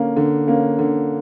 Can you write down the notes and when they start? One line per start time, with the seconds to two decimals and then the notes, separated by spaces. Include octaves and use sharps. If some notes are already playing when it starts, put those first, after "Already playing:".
Already playing: D3 A#3 C#4
0.17 D3
0.47 A#3 C#4
0.79 D3